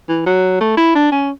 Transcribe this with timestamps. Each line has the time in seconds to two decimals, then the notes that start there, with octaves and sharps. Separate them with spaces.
0.09 E3
0.26 F#3
0.61 A3
0.77 E4
0.95 D4
1.12 C#4